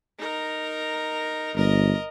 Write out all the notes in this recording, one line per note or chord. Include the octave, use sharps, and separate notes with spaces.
D#4 A#4
G1 A#4 D#5